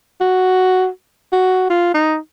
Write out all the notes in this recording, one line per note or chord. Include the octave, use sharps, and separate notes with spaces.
F#4
F#4
F4
D#4